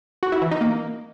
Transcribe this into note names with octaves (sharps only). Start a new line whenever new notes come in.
F#4
E4
E3
D#4
A#3